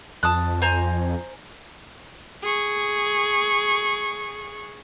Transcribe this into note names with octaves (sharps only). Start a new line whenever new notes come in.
F2 A5 D#6 F#6
C5 G#5 A#5
G#4 C#6